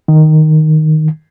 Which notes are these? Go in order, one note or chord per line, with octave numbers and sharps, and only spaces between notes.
D#3